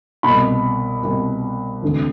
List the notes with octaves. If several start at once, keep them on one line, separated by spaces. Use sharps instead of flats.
C2 B2 B5
C2 B2
E1 D2 C3 E3